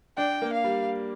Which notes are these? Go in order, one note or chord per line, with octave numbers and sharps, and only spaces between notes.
D4 G5
A#3
F5
G3